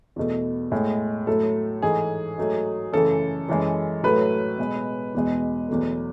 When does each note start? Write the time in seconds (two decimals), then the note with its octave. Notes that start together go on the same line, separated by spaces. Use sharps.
0.16 E2 B2 A3
0.71 A2 G#3
1.27 A2 F#3 A3 A4
1.82 G#2 E3 A3 G#4
2.38 G#2 F#3 A3
2.92 F#2 C#3 E3 A3 A4
3.48 F#2 E3 G#3
4.03 A2 F#3 A3 B4
4.58 B2 G#3
5.15 E2 B2 G#3
5.69 E2 B2 F#3 A3